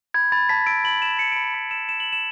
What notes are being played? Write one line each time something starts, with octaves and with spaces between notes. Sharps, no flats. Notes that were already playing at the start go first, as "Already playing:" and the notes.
B5 G#6
B5 A6
A5 B6
E6 D7
B5 F#7
E6 E7
B5 C#7
B5 D7
C#7
B5 B6
E6 E7
B5 E7
F#7
B5
E7